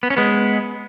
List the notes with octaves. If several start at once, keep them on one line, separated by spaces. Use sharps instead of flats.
B3
C#4
G#3 B3